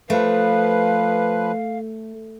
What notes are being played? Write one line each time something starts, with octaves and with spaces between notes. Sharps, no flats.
F3 A3 B4 F5